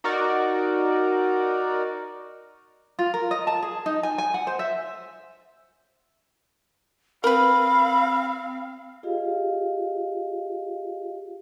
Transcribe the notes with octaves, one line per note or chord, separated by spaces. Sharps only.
D#4 F#4 A#4 D5
F4
A#4
D#5
A5
G#4
D#4
G#5
G#5
F#5
C5
E5
C4 A#4 B4 F5 B5
F4 G4 G#4 D#5 F5